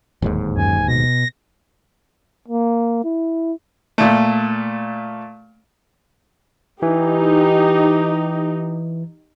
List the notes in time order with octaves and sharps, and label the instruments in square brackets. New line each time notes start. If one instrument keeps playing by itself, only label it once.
[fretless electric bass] D1 D#2 G#2
[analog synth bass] F#2 [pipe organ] G#5
[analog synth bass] B2 [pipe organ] A#6
[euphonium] A#3
E4
[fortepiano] A#2 A3
[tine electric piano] E3 [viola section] D#4 G4